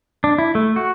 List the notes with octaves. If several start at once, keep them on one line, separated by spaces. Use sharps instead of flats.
D4
E4
A3
F#4